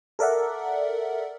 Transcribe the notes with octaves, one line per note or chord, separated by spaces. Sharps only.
A4 A#4 D5 E5 F#5